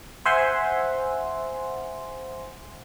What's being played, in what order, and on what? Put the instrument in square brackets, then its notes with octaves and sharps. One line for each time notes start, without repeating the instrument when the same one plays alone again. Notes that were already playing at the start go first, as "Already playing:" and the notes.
[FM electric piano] C5 E5 F#5 G#5 C6